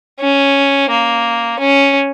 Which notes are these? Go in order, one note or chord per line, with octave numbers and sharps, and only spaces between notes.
C#4
A#3
C#4